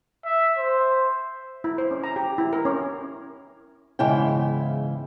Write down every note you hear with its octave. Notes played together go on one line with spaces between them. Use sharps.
E5
C5
E4
C5
C#4
A#5
G4
E4
A#4
C#4
E2 G#2 C#3 E4 G5